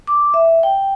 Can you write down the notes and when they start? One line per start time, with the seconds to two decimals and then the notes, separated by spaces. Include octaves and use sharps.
0.07 D6
0.34 E5
0.63 G5